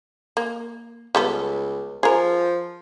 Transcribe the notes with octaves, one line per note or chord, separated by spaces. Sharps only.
A#3
C#2 G3 B3 A4
F3 G#4 A#4